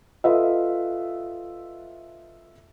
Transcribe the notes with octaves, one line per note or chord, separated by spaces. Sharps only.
F4 A4 B4 D#5 E5